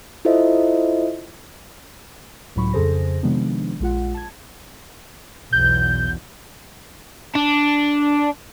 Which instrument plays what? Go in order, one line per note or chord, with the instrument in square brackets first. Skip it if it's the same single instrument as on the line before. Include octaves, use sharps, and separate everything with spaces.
[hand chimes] E4 F4 A4 C5 D#5 E5
[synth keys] C#2 A2 F#3 B5 C#6
F2 C#3 G#4 A4 C5 A#6
C3 D#3 F3 G#3 B3 D4
A#1 G#3 F4 F#5
A5 G#6
[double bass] B1 E2 [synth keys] G6
[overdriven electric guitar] D4